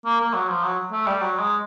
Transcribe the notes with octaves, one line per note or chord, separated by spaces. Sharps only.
A#3
A#3
F#3
F3
F#3
A3
G3
F#3
G#3